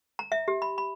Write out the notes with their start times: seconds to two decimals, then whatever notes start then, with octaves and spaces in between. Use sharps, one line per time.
0.19 A#5
0.32 E5
0.48 G4
0.62 B5
0.78 B5